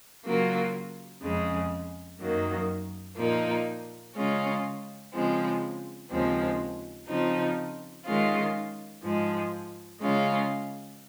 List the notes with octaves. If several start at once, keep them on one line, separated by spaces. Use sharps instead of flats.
C#3 F#3 A#3 F4
F2 C#3 G#3
F#2 D#3 F#3 A#3
A#2 F3 A#3 D#4
C#3 G#3 C#4 F4
C#3 F3 G#3 C4
D#2 C#3 F3 G#3 C4
C#3 F3 C4 D#4
D#3 G#3 C#4 F4
G#2 F3 G#3
C#3 G#3 C#4 F4